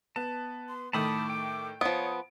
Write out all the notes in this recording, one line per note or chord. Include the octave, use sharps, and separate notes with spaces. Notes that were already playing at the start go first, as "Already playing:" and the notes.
B3 A5
C6
A2 D#3 A3 A5 B5 D6 D#6
G5
F3 B3 C#5 D#6 D7